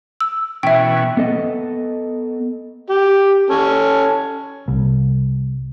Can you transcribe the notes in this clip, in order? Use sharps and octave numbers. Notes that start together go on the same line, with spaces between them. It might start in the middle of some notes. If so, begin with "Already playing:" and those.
E6
B2 E3 C#4 E5 G5
B3 A4 D#5
G4
C#4 A4
C2